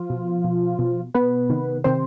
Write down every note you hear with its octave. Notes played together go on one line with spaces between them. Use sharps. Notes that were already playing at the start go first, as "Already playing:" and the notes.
Already playing: F3 F4
B2
B2
B2
B2 B3 B4
C3 D#3
C3 D#3 C4 C5